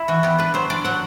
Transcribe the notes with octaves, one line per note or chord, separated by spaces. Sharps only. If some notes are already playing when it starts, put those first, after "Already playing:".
Already playing: E4
E3 F#4
B3 G4
D4 B4
F#3 C5
D4 D5
F#3 F#5